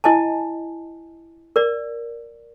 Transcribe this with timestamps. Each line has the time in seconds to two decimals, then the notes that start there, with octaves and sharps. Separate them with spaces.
0.04 E4 D#5 G#5 A5
1.56 A#4 D5